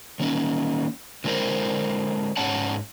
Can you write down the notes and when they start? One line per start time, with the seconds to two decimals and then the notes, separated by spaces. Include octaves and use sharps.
0.20 D#3 A#3 C#4 D#4
1.24 D3 F#3 G#3 E4 A#4 C5
2.37 G#2 C#4 C#5 F#5 A5